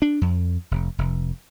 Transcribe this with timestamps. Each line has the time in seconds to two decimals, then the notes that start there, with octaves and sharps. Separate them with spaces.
0.02 D4
0.21 F2
0.71 F1
0.98 F1